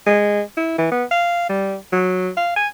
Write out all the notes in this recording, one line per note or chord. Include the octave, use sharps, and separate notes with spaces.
G#3
E4
E3
B3
F5
G3
F#3
F5
G#5